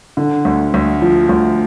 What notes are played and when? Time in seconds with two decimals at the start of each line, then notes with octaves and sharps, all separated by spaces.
0.17 D3
0.45 D2
0.74 D2
1.02 F3
1.29 D2